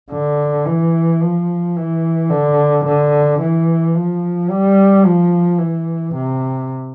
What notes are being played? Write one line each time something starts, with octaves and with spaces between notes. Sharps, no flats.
D3
E3
F3
E3
D3
D3
E3
F3
G3
F3
E3
C3